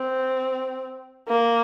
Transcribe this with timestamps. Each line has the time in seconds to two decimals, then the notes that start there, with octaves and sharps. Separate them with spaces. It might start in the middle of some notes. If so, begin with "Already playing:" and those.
Already playing: C4
1.28 A#3